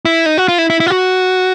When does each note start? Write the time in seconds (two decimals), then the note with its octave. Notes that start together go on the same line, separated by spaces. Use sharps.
0.05 E4
0.26 D#4
0.38 F#4
0.48 F4
0.58 E4
0.70 E4
0.80 E4
0.86 F4
0.90 F#4